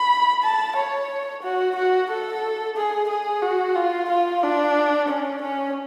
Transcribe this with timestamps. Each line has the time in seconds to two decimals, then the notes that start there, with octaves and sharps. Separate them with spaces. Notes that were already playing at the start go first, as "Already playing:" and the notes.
Already playing: B5
0.43 A5
0.76 C#5
1.43 F#4
1.75 F#4
2.10 A4
2.76 G#4
3.09 G#4
3.42 F#4
3.75 F4
4.09 F4
4.42 D4
5.08 C#4
5.42 C#4